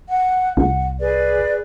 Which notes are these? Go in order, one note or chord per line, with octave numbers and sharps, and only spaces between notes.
F#5
C2 F#5
G#4 B4 D5